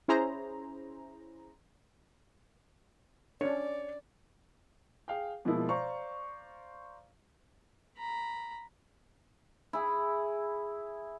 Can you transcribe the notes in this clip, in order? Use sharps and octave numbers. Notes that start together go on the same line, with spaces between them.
C#4 E4 G#4 C5 A#5
C#4 D4 C#5 D5
G#4 F5 G5
B2 F3 G#3 A#3 E4
C5 D5 F5 A#5 C#6
A#5 B5
E4 G#4